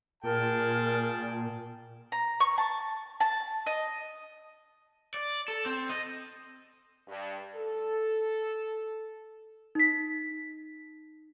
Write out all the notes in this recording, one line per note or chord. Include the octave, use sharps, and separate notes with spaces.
A#2 G#4 A#4 G5 A5
A#5
C#6
A5
A5
D#5
D5
A4
C4
D#5
G2
A4
D#4 B6